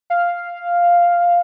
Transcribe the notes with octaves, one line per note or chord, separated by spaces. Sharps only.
F5